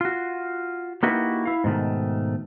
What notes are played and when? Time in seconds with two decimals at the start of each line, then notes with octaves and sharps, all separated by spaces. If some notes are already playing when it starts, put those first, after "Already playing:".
0.01 F4 F#4
1.03 A#3 D#4 E4 F#4 G4 B4
1.46 E4 F5
1.64 G#2 B2 D#3 A3